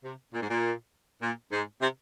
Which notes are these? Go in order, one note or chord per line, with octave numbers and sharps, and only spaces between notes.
C3
A#2
G#2
A#2
A#2
G#2
C3